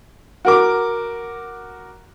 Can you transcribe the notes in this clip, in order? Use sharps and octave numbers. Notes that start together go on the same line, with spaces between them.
F#4 A#4 D6